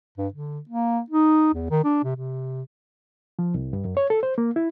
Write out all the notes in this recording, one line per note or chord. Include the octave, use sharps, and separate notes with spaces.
G2
D3
A#3
D#4
E2
D#3
D4
C3
C3
F3
C2
G2
F#2
C#5
A4
C5
A#3
E4